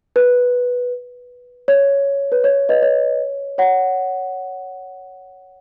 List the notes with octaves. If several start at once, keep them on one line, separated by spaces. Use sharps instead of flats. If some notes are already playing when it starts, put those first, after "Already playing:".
B4
C#5
B4
C#5
B4 D#5
C#5
C#5 F#5